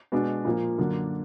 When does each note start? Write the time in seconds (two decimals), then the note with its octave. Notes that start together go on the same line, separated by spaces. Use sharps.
0.12 B2 G#3 D4
0.45 A#2 F3 A#3
0.78 F#2 D3 F#3 A#3 D4